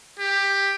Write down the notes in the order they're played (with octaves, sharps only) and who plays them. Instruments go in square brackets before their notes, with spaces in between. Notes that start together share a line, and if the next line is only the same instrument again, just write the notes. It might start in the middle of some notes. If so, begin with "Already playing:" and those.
[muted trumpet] G4